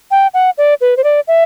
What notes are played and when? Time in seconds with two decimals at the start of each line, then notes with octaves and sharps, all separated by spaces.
0.11 G5
0.34 F#5
0.58 D5
0.81 B4
0.97 C5
1.04 D5
1.28 E5